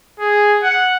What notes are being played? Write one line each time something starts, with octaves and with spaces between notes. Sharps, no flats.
G#4
F#5